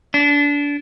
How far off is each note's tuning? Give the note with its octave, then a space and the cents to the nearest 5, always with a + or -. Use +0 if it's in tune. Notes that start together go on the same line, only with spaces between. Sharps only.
D4 -25